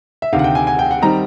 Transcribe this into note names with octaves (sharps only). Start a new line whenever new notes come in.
E5
D2 C3 D#3 F5
F#5
G5
G#5
G#5
G5
F#5
D#3 G3 C4 D#4 A#5